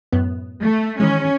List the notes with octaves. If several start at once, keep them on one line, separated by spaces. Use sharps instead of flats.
F#2 A2 B3
A3
D#3 E3 G#3 C#4